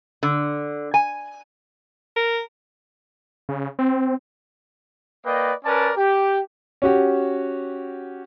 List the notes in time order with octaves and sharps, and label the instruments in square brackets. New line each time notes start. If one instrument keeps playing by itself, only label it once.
[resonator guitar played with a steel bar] D3
G#5
[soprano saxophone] A#4
[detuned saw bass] C#3
C4
[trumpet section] A#3 B4 D5 D#5 G5
C#4 A#4 B4 D5 A5
G4
[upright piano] C#4 F#4 G4